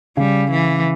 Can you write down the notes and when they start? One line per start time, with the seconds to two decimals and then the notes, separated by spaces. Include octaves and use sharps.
0.17 C#3 G3
0.52 E3